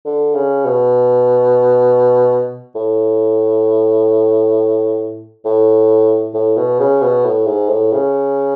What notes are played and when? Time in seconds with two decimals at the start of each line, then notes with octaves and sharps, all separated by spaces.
0.06 D3
0.35 C#3
0.65 B2
2.75 A2
5.45 A2
6.34 A2
6.57 B2
6.79 C#3
7.02 B2
7.25 A2
7.47 G#2
7.69 A2
7.92 C#3